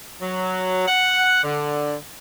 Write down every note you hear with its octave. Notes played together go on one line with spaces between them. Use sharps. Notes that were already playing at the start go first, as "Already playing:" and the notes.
F#3
F#5
D3